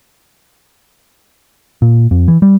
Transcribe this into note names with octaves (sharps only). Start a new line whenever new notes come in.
A#2
F2
E3
G3